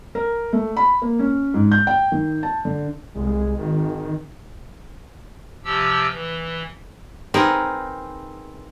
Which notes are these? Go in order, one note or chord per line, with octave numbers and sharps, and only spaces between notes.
A#4
A3
B5
A#3
C#4
G#2
G6
G5
D#3
A5
D3
C2 G#3
G#1 D#3
C3 F3 G4 E6
E3
C4 D#4 G#4 A#4 B4